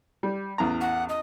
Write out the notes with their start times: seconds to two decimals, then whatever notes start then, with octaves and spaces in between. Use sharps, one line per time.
0.23 G3
0.58 A1 E2 A#5
0.81 F#5
1.09 D#5